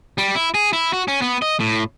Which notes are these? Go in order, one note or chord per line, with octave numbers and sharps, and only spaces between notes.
G3
E4
G#4
E4
F#4
C#4
B3
D#5
A2